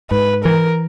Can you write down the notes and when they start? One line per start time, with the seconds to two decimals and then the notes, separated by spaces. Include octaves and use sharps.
0.11 G#2 B4
0.45 E3 A#4